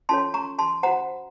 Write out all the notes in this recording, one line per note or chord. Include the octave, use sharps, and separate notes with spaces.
C#4 F4 A4 C#5 A5 C6
A#5 C#6
A5 C6
F#4 C5 F#5 A#5